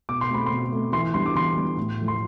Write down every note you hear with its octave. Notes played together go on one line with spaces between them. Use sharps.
B2 D6
C6
A3 C4 B5
B2 C6
A3 C4
E3 C6
G3 B3 D4 C6
D6
E3 C6
G3 B3 D4
A2
F3 A3
C6